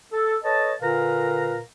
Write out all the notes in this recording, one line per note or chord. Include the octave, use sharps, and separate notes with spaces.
A4
A4 B4 C#5 D#5 A5
A#2 D3 A#4 B4 F5 A#5